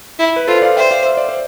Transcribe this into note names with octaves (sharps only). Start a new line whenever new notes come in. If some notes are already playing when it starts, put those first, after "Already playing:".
E4
B4
F4 A4 C5
D5 F5
C5 E5 G5
D5 F5
E5
D5
C5